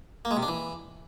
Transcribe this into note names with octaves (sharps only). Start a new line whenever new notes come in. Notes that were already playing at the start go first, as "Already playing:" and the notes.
A#3
G#3
C3
D4
E3